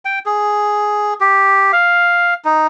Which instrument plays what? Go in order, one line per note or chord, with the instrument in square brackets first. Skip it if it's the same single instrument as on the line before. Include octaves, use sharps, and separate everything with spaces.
[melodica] G5
G#4
G4
F5
D#4